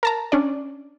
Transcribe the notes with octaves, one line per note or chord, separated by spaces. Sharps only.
A#4 A5 A#5
C#4 D4 D5